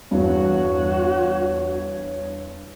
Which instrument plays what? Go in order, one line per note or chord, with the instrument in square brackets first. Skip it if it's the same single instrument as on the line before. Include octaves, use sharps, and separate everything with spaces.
[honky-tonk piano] E2 G2 [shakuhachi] F#4 [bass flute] C#5